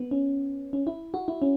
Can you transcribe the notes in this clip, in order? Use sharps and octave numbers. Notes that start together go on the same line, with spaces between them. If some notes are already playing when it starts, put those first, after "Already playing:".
Already playing: B3
C#4
C#4
E4
F#4
E4
C#4